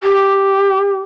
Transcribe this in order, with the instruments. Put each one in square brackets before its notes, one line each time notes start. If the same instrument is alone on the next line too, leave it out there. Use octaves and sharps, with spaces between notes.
[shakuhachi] G4